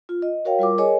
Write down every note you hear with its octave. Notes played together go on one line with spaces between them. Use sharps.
F4
D#5
F#4 A#4 C#5 F5 G5
G3 F4 A#4 D6
G#4 A#4 C#5 D#5 G#5